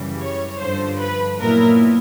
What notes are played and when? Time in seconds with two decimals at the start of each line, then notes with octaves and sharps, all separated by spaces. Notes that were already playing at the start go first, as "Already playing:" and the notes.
Already playing: F#2 C#3 E3 G3
0.19 C#5
0.59 G2 D3 F3 C5
0.99 B4
1.38 A#2 F#3 B3 E4 A#4